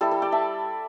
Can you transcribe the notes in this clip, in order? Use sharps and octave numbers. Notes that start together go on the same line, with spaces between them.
G3 E4 A4
A4
D5 G5
E5 A5